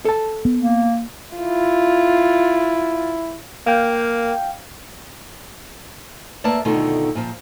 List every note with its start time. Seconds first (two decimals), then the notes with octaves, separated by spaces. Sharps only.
0.05 A4 A5
0.45 B3
0.58 A#3
1.36 E4 F4
3.66 A#3 F5 G5
6.44 A3 A#3 B4 D5 E5 A5
6.65 B2 D3 D#3 A3 D#4 F4
7.15 A#2 F3